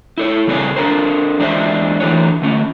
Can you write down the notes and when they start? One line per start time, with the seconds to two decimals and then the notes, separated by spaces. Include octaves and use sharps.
0.18 E4 A4 C#5
0.47 C#3 G3 C4 G#4 A4 C#5
0.76 D4 A4 A#4 C5
1.39 E2 G#3 D4 D#4 C5 E5
2.00 E3 F#3 A3 D4 C#5
2.42 D3 A3 C#4